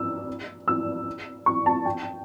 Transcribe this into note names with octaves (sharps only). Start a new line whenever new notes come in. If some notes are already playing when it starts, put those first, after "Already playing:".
Already playing: E6
E6
C#6
A5
G5